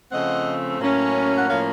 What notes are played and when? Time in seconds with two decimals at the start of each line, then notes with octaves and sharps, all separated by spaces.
0.12 C#3 F3 A3 C4 D#5 F#5
0.80 A2 F#3 A#3 C#4
1.36 F#5
1.48 A2 F3 A#3 C#4 C#5 F5